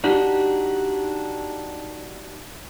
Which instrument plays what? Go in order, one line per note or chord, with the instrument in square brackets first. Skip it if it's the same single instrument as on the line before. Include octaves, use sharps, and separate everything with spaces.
[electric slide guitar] D4 D#4 F#4 G4